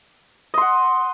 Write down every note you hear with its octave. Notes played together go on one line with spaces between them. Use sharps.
D#5 F#5 C6